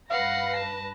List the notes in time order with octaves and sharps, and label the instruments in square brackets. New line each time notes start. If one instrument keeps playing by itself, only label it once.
[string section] G2 B4 A#6 [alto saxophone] F5 [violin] F#5 C7
[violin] A5